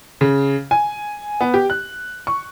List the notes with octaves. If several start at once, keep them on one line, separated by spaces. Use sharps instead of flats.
C#3
G#5
B3
G4
F#6
C#6